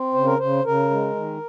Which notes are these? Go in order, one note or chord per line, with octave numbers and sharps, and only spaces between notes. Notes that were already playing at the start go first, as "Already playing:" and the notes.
Already playing: C4
C#3 C5
A#4
C#3 C5
C#3 A#4
G#3
D#3